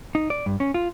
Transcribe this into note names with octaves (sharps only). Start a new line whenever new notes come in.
D#4
D5
G2
C#4
F4